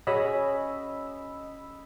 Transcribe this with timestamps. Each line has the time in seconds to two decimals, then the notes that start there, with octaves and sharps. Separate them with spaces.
0.07 C#4 F#4 G#4 D#5 B5 E6